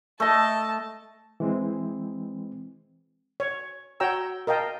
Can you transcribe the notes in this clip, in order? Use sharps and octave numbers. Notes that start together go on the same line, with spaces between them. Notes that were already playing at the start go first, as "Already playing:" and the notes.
A3 D#5 A5
E3 G#3 C4
C#5
F#4 C#5 G5 A#5 E6
A#4 D#5 F5 G5 A5